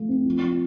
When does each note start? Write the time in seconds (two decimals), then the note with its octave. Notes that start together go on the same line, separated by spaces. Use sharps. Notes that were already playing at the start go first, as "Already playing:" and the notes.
Already playing: F3 A3 F4
0.09 C4
0.26 F3
0.42 F3